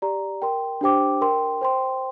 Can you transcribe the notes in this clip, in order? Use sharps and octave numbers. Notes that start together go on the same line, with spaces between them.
G4 D5 A#5
A#4 G5 C6
D4 G4 C5 G5 D6
A#4 G5 C6
C5 G5 C6